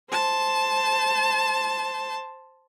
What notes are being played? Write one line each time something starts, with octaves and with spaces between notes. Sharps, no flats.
C5 A5